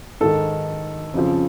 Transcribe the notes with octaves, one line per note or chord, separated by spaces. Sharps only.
G#2 D#3 A4
F2 C#3 F3